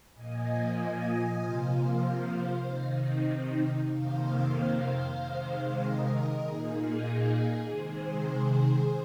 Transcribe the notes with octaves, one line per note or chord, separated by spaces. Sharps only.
A#2 F3 A#3 D#5 G#5
C3 F3 A#3 C5 F5
C5 F5
C3 D#3 C4 D#4
F2 C3 D#3 A#3 C5 F5
C3 D#3 G#3
A#4 D#5
A#2 A#3 D#4 G#4
C3 D#3 G#3 G#4 C5